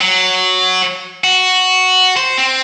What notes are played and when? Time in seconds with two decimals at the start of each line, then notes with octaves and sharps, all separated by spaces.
0.01 F#3
1.24 F#4
2.17 C5
2.38 C4